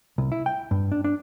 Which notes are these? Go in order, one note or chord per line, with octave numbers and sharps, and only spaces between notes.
C2
E4
G5
G2
D4
D4